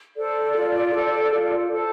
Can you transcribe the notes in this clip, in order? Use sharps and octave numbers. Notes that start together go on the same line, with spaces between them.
A4 C5 D5
F4
A4 C5
F4
A4 C5